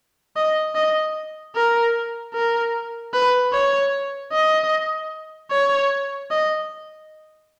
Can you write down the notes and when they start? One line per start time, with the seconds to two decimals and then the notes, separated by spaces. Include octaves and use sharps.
0.36 D#5
0.75 D#5
1.55 A#4
2.34 A#4
3.14 B4
3.53 C#5
4.32 D#5
5.51 C#5
6.30 D#5